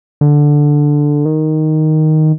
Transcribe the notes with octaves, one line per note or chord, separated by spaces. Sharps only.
D3
D#3